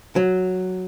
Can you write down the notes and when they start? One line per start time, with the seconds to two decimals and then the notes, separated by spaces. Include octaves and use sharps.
0.16 F#3